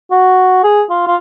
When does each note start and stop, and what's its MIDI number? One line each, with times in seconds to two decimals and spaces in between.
0.11 0.62 66
0.63 0.82 68
0.90 1.05 65
1.07 1.16 65